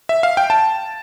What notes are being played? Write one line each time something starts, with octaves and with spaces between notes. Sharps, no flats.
E5
F5
G5
A5